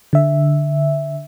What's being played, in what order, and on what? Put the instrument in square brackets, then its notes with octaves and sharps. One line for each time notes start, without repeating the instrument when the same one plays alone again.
[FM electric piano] D3 E5